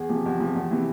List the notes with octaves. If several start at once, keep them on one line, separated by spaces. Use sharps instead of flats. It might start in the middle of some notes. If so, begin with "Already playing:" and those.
Already playing: E2 G#4
C3 F3 G4
E2 G4
C3 F3
E2
C3 E3